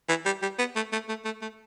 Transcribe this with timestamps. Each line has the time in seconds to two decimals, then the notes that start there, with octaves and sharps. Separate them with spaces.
0.09 E3
0.26 G3
0.42 G3
0.59 B3
0.76 A3
0.93 A3
1.09 A3
1.25 A3
1.42 A3